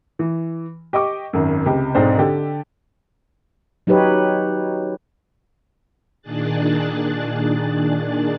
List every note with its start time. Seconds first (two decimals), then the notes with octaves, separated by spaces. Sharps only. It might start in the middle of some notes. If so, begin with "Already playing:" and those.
0.19 E3
0.93 G4 D#5 C#6 D6
1.33 G#1 F#2
1.66 C#2 C3 G4
1.95 B1 G#2 C4 D4 C5
2.18 D3 G4 A4
3.87 F#3 D#4 G4 B4 C#5
6.22 A#2 D#3 D4 G#4 F#6 A6